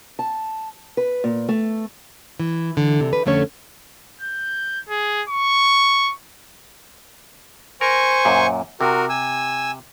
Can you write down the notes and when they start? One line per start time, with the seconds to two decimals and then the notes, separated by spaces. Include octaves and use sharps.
0.19 A5
0.97 B4
1.24 A#2
1.49 A3
2.40 E3
2.77 D3 E3
3.01 C3
3.13 B4
3.26 F2 D3 A3 C#4 C#5
4.21 G6
4.89 G#4
5.30 C#6
7.81 A#4 C5 G#5 C#6
8.25 F#2 A#2
8.81 C3 F#4 A#4
9.09 G#5 E6